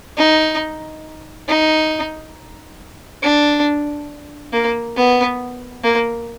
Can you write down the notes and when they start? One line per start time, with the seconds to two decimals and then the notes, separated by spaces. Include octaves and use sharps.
0.17 D#4
1.48 D#4
3.22 D4
4.53 A#3
4.96 B3
5.83 A#3